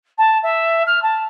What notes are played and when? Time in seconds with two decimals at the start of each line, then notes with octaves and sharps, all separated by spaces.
0.17 A5
0.43 E5
0.86 F6
1.02 A5